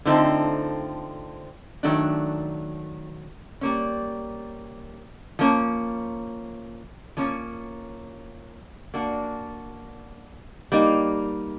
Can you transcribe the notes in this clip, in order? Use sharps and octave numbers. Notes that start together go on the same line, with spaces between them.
D3 F3 A3 C4 D#4
D#3 F#3 A3 D4
G3 A#3 C#4
F3 A#3 C#4
F3 A#3 C#4
A#3 D4 F#4
G3 A#3 D#4